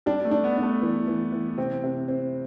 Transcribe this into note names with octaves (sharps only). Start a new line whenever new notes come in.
G3 D4
A3
D4
B3
D4
A3
E3
E3
E3
C3 C4
C3
C4